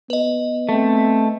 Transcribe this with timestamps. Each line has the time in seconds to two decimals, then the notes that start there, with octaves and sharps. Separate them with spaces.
0.10 B3 B4 D#5
0.69 A3 C4